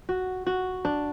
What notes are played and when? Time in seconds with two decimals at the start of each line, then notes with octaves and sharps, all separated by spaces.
0.09 F#4
0.47 F#4
0.85 D4